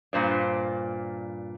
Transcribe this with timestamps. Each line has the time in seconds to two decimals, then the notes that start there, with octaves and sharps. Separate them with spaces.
0.13 G2 A#2 C5 D5